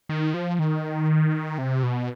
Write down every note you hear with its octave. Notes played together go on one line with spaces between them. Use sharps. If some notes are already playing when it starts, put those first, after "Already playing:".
D#3
F3
D#3
C3
B2